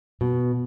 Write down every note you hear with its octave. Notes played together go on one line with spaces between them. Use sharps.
B2